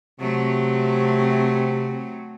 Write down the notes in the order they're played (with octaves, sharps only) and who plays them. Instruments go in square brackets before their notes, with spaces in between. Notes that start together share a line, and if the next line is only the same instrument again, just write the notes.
[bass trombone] C3 [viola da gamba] F#3 A3 C4